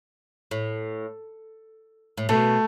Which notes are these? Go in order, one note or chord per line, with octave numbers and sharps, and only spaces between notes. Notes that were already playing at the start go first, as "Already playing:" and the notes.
A2
A2
B2 A3